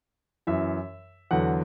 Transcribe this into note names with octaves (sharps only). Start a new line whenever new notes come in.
F#2 E3 E5
E2 D3 F#3 F#5